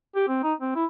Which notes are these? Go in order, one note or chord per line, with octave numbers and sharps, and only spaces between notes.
G4
C4
D#4
C4
E4